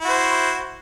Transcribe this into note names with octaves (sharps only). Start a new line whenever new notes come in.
E4 F#4 C5